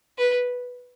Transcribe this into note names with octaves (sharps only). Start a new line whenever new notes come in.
B4